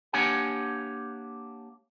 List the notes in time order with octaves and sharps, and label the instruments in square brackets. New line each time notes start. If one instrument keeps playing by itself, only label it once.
[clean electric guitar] A#3 D4 G4 C#5 F#5 G#5